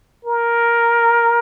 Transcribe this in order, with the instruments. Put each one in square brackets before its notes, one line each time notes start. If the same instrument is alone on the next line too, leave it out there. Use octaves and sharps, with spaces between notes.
[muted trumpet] A#4